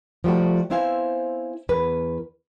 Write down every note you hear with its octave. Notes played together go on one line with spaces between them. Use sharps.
F3 G3 A3 F#4
B3 C4 E4 C5 F5 G#5
E2 A#4 B4